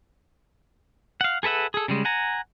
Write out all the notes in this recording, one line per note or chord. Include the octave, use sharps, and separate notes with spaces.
F5 F#5
G#4 A4 B4 E5 F#5
G#4 A4
C#3 G3 G#3
F#5 G#5 A#5